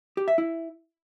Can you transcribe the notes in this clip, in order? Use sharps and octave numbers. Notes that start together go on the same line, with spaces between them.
G4
E5
E4